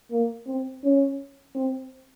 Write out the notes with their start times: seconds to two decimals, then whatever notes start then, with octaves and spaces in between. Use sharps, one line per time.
0.11 A#3
0.46 C4
0.83 C#4
1.55 C4